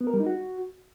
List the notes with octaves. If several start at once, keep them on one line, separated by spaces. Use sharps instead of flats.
B3
A#4
G3
D#4
F#4